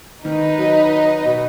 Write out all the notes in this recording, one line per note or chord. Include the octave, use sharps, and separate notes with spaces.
D#3 D#4 B4 D#5
F#3
B2